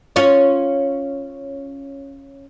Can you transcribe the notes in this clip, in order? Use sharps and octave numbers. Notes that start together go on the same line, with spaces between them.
C#4 F4 C#5